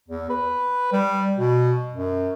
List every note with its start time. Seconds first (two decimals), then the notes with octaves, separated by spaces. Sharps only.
0.08 E2
0.30 B4
0.92 G3
1.37 B2
1.93 F#2